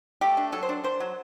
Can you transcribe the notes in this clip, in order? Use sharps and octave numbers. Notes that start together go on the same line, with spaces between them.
A3 G4
D4
F#3 A4
C5
D4
D4 C5
F#3